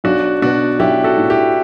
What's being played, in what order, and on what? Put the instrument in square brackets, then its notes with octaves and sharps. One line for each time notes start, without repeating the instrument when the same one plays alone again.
[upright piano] B1 [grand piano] D4 F#4
[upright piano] B2 [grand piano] D4 F#4
[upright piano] B1 [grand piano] E4 G4
[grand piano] F#4 A4
[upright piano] A2
[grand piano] E4 G4